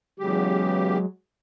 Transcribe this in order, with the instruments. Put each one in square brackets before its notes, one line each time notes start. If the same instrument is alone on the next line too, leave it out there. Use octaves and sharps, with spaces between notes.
[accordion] E2 C#3 G4 [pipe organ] F#3 G#3